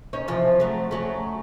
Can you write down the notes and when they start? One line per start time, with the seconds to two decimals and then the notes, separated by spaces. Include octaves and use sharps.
0.13 C#4 D#4 C#5
0.28 C3 E3 F3
0.60 F#3 A3
0.91 C#3 F#3 A3